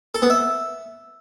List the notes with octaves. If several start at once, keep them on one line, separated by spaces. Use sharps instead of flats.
A4
B3
E5